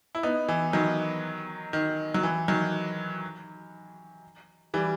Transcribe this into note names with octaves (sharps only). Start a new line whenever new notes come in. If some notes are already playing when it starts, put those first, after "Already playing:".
E4
B3 D#4
E3
D#3 F#3
D#3
F#3
E3
D#3 F#3
E3 G3